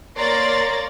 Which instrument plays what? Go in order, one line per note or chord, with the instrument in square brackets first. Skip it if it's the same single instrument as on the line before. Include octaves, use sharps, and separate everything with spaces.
[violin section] A#3 C#5 D5 A#5 C6 A6